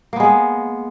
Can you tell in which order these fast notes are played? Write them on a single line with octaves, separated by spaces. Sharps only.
A#3 B3 G#3